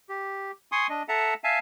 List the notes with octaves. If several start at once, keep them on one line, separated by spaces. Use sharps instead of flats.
G4
G#5 C6 C#6 D#6
D4 D#5
A4 E5 F#5 A5 A#5
E5 F5 G#5 A5